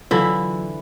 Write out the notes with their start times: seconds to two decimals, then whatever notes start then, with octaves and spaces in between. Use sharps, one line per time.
0.11 D3 E3 F#3 E4 F4